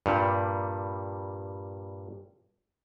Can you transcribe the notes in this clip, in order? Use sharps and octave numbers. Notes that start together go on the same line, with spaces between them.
G2 A#2 G3